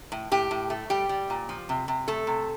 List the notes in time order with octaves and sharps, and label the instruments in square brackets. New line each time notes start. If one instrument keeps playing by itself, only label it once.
[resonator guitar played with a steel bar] A2
A2 G4
A2
A3
G3 G4
G3
A#2
F3
C3
C3
A3 A4
C3